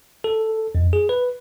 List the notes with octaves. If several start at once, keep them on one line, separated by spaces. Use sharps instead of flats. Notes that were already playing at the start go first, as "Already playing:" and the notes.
A4
F2
G#4
B4